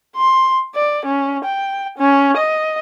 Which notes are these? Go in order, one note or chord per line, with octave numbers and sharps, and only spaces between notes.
C6
D5
C#4
G5
C#4
D#5